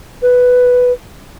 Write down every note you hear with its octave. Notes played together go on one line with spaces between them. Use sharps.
B4